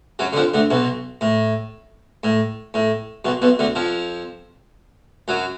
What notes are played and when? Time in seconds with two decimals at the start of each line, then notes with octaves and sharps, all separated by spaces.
0.19 F#2 F#3
0.33 D3
0.36 F2 F3
0.54 D2 D3
0.70 B1 B2
1.21 A2
2.23 A2
2.74 A2
3.25 B1 B2
3.42 B1 B2
3.59 D2 D3
3.75 F2 F3
5.28 F#2 F#3